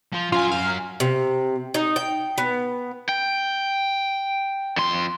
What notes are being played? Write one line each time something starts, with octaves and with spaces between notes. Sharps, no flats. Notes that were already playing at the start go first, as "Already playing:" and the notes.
F3 F4
F#2 F4 G#5
F5
C3
D#4
G5
B3
G5
F2 C6